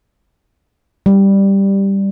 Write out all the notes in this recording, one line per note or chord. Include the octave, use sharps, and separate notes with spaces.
G3